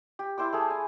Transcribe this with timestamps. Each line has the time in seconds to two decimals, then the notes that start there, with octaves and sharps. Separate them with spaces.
0.19 G4
0.38 E4 C5 G5 D6
0.53 A3 G#4
0.70 G#5